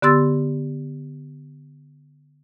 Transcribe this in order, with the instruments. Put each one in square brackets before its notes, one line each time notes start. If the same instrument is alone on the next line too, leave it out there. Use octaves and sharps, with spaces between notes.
[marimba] D3 B3 G4 C6 E6 A6